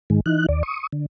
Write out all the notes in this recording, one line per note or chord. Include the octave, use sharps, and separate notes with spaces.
G#2 D#3 G#3
E3 D#4 F#6
D#2 D5
C#6 D#6
D3